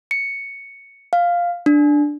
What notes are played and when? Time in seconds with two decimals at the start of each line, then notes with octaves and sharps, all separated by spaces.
0.11 C#7
1.13 F5
1.66 D4